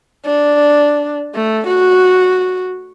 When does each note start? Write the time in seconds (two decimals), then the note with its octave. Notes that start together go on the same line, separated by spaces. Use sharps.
0.25 D4
1.34 A3
1.67 F#4